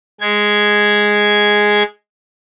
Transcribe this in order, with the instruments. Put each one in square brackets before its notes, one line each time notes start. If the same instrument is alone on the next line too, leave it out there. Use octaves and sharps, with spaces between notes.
[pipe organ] G#3 G#6